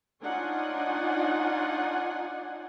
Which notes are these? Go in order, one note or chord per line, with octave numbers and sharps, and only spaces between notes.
D4 D#4 F4 C#5 F#5 G#5